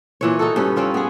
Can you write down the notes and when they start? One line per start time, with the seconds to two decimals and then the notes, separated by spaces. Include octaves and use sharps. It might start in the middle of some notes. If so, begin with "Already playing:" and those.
0.21 A#2 E3 C#5
0.39 D#4 F#4 A4
0.56 G2 C#4 B4
0.76 C4 C#4 F4 C#5
0.94 B3 G#4